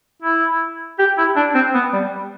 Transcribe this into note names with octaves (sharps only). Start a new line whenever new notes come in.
E4
G4
E4
D4
C4
B3
G3